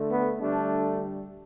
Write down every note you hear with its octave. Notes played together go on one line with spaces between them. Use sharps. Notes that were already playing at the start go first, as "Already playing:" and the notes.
Already playing: D3 A3
B3
D3 G3 A3 D4